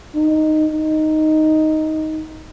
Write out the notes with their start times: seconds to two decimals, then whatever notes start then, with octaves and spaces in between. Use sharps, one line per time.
0.15 D#4
0.73 D#4